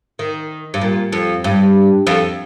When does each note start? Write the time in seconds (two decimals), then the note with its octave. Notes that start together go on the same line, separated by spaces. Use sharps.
0.19 D#3
0.74 G2
0.82 A#2
1.13 F2
1.44 G2
2.07 F2